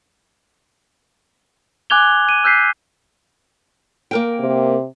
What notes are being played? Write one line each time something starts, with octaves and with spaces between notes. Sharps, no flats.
G#5 D6 F#6 G#6 F7 G7
D#7
E6 F#6 G6 B6 C7
A#3 A#4 G5
C3